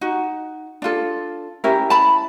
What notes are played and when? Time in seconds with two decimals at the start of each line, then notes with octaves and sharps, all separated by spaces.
0.01 D#4 F#4
0.82 D4 F4 A4
1.64 C#4 E4 G4 A#4
1.90 A5 B5